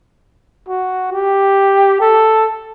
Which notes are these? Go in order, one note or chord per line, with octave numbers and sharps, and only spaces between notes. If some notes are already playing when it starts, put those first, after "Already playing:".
F#4
G4
A4